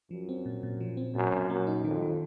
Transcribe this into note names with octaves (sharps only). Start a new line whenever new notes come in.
F#2 F3
C4
A#2
A#2
F3
C4
F#2 A#2
A#2
F#2 A#3
D#4
F2 D#3
D#3